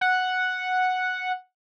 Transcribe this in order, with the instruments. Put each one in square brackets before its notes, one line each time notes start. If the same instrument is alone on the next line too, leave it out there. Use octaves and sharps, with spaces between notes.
[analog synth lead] F#5